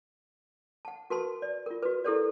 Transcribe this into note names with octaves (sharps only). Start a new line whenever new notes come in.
F#5 A5
F#4 A#4 B4 A5 C6
D5
F4 A#4
F#4 B4
E4 G4 A4 A#4 C5 D5